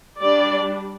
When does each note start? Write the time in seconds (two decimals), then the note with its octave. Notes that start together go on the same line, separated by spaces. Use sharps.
0.21 G3 D4 D5